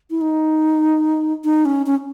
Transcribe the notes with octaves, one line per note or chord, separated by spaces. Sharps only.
E4
D#4
D#4
C#4
C#4